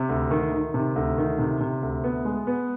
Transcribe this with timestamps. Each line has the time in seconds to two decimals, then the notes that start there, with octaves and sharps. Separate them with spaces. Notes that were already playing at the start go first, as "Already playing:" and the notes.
Already playing: C3
0.09 D2
0.31 D#3
0.52 D#3
0.74 C3
0.96 D2
1.18 D#3
1.39 C3
1.60 C3
1.82 D2
2.04 B3
2.25 G#3
2.47 B3